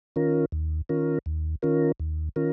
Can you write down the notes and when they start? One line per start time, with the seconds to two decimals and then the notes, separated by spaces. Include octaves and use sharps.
0.16 D#3 C#4 F4 A#4
0.52 D#2
0.89 D#3 C#4 F4 A#4
1.26 D#2
1.62 D#3 C#4 F4 A#4
1.99 D#2
2.36 D#3 C#4 F4 A#4